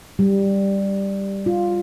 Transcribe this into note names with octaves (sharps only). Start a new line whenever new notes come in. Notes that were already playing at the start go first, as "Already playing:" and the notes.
G3
F4